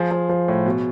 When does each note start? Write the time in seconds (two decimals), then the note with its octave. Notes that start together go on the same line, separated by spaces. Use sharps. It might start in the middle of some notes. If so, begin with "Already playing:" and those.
Already playing: F3 G#4
0.11 F3
0.29 F3
0.48 A2
0.66 B2